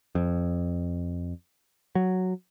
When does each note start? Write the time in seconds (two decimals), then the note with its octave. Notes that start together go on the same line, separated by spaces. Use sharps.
0.15 F2
1.95 F#3